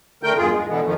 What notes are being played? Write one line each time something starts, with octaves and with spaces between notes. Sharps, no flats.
D3 A3 A#4 G5 G6
E2 G2 F4 G#4
G#3
B2 D3 E3 B3
F2 D#3 F3 A3